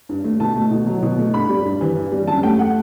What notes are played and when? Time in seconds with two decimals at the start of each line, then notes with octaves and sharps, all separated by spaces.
0.09 G2
0.24 A3
0.40 B2 A5
0.55 A3
0.71 B2
0.86 F#3
1.03 B2
1.19 A3
1.34 G2 B5
1.50 G3
1.65 G2
1.81 E3
1.96 G2
2.12 G3
2.27 F#2 A5
2.43 A3 G5
2.59 F#5